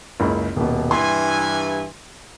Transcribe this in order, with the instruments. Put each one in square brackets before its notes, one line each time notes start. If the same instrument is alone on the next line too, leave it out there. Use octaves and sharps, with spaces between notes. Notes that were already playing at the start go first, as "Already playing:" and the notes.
[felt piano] F#1 C#2 C#3
D#1 B2
[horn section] G2 E3 G#5 [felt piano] C6